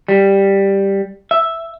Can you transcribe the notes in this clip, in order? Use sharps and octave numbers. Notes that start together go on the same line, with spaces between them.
G3
E5